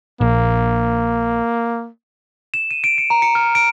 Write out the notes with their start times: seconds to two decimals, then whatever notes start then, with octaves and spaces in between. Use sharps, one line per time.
0.21 A#1 A#3
2.54 E7
2.71 D#7
2.84 D7
2.98 C#7
3.10 A#5
3.22 C#7
3.35 F6
3.55 D7